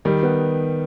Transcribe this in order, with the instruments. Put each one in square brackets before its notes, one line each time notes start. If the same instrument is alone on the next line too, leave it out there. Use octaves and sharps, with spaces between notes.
[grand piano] D#3 [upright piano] G3
[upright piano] B3